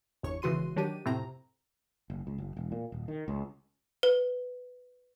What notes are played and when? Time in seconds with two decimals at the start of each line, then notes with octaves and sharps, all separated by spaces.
0.23 G1 E2 G2 C#5 C#6
0.42 G#1 C#3 E3 F#4 C6 D#7
0.76 D#3 F#3 D4 G4 D#7
1.05 F2 A2 C3 C4 A#5
2.10 F#1
2.27 C#2
2.38 F#1
2.57 E1
2.72 A#2
2.92 D#1
3.08 D#3
3.28 C#2
4.03 B4